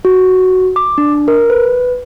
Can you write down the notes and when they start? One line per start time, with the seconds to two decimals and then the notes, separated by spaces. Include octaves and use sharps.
0.05 F#4
0.76 D6
0.98 D4
1.28 A#4
1.50 B4